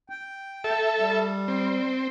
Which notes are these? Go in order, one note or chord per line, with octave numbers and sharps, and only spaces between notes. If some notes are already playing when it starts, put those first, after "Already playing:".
G5
A4 E5
G3
C4